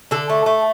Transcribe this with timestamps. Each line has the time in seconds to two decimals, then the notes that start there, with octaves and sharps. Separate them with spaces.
0.11 D3 A4
0.30 A3
0.46 A3